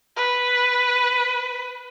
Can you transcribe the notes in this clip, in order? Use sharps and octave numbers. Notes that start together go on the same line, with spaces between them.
B4